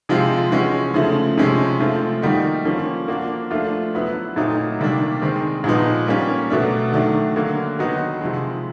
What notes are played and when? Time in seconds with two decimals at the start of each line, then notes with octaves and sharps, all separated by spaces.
0.09 C3 F3 G#3 C4 F4
0.51 E3 G#3 C#4 F#4
0.94 C#3 F3 A3
1.37 C3 F3 G#3 C#4
1.80 F3 A3 C4 F4
2.22 D#3 G3 A#3 D#4 F#4
2.65 F3 A#3 C#4
3.08 F3 A#3 D4 F#4
3.51 F3 A3 D4 F4
3.94 F#3 B3 E4
4.36 A#2 F#3 A3 C4 D#4
4.79 C3 D#3 G3 A#3 D4
5.22 D#3 G#3 C4
5.64 A#2 F3 G#3 B3 D#4
6.07 G3 A#3 C#4
6.50 B2 F#3 A3 D4
6.92 D#3 F#3 A3 D4
7.36 D3 F#3 A#3
7.79 D#3 F#3 B3 D#4 F#4
8.21 C3 F3 G#3